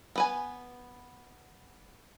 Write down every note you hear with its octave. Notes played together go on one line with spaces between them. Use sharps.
B3 B4 G#5